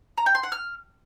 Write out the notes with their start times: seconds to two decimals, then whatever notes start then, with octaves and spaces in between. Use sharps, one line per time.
0.18 A#5
0.26 G5
0.35 C6
0.43 F#5
0.52 F6